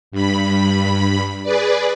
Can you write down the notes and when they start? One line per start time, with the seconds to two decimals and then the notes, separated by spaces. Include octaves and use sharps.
0.12 G2 B5
1.43 G#4 B4 D5